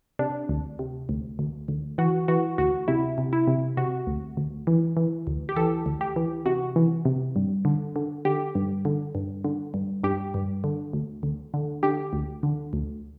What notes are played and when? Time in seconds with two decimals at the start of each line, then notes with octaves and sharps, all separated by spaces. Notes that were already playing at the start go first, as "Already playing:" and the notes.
0.19 C3 D4
0.49 D2
0.79 C3
1.09 D2
1.39 D2
1.68 D2
1.98 E3 F#4
2.28 E3 F#4
2.58 D2 F#4
2.88 C3 E4
3.18 C3
3.33 E4
3.47 C3
3.77 C3 F#4
4.07 D2
4.37 D2
4.67 E3
4.97 E3
5.27 D2
5.49 G4
5.57 E3 A4
5.86 D2
6.01 G4
6.16 E3
6.46 C3 F#4
6.76 E3
7.05 C3
7.36 G2
7.65 D3
7.96 D3
8.25 D3 G4
8.55 G2
8.85 D3
9.15 G2
9.44 D3
9.74 G2
10.04 G2 G4
10.34 G2
10.64 D3
10.93 D2
11.23 D2
11.54 D3
11.83 D3 G4
12.13 D2
12.43 D3
12.73 D2